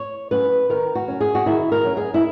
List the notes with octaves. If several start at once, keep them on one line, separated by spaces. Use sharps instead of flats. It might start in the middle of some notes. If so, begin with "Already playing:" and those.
Already playing: C#5
F#3 C#4 B4
D#3 A#4
F#4
F#3 C#4
G#4
F#4
D#3 E4
A#4
F#3 C#4
G#4
E4